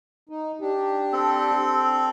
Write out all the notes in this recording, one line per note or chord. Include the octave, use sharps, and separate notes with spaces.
D#4
D4 G4
C4 A4